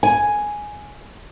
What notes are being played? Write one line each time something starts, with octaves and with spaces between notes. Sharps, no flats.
G#5